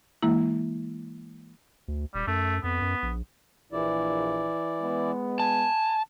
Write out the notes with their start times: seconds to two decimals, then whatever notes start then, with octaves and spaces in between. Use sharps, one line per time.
0.23 E3 G#3 A#3 E4
1.88 D2
2.14 D#1 G3
2.27 F#2 A3
2.63 F2 B3
2.82 F#2
3.02 A#1
3.72 A#1 E3 E4 D5
4.82 G#3 B3
5.40 G#5 A5